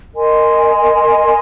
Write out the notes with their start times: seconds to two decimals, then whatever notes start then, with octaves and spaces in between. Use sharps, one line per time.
0.14 A#4 D#5 G#5 C6